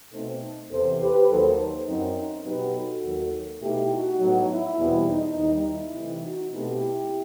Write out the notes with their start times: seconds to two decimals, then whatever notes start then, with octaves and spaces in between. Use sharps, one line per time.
0.12 B2 A3 C4 D#4 A4 C5
0.70 E2 C3 E3 A4 C5
1.00 G4 B4
1.29 D#2 D#3 F#3 A4 C5
1.87 F#2 F#3 C4 D#4
2.45 B2 F#3 B3 D#4 G4 B4
2.74 F#4 A4
3.04 D#2 D#3 F#3
3.62 B2 A3 D#4 E4 G4
3.91 D#4 F#4
4.20 A2 F#3 B3
4.49 E4
4.78 E2 B2 G3 C4
5.07 D#4
5.36 D#2 D#3 G3 D#4
5.65 E4
5.94 C3 E3 A3
6.23 D#4 F#4
6.52 B2 A3 C4 E4 G4